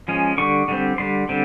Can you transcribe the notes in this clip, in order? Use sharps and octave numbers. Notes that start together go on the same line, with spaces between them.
F3 G#3 C#4
D3 G3 C#6
D3 G3 C4
D3 G3 C6
D3 G3 C4